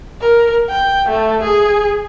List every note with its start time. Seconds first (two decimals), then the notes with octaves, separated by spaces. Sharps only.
0.21 A#4
0.70 G5
1.09 A3
1.43 G#4